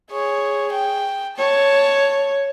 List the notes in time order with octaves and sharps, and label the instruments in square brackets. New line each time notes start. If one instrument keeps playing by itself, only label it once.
[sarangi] G#4 [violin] C#5
[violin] G5
[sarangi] C#5 [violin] A5